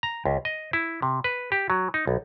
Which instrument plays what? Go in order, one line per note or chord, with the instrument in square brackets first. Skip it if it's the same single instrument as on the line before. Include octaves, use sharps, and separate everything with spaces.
[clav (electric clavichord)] A#5
C#2
D#5
E4
C3
B4
G4
F#3
D#4
B1